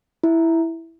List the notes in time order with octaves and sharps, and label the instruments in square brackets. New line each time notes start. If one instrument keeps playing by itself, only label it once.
[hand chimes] E4